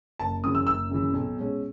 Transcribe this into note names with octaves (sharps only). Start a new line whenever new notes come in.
F#1 A5
F#2 C#3 E3 D#6
E6
F#1 E6
F#2 C#3 E3
B1
B2 G#3 C#4